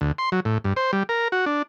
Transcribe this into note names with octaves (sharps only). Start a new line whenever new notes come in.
D2
C6
F#3
A2
G2
C5
G3
A#4
F#4
D4